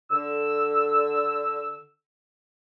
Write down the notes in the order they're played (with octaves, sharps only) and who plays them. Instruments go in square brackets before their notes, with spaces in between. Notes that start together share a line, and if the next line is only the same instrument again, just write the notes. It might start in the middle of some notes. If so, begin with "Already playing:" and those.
[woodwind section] D3 E6